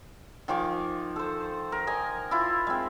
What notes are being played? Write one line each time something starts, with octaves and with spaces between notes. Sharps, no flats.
D#3 F3 G#5 D6
A4 C5
A#4
D#5 G#5
E4 F4
G#3 C4